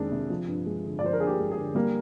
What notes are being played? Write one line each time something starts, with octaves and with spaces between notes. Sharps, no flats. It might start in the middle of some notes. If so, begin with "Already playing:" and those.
Already playing: F2 D#3 G#3 D4
C3
F3
G2
G#3
D3
D5
F3 C5
A#4
G2 G#4
G4
G#3
G#4
D3
G3 A#3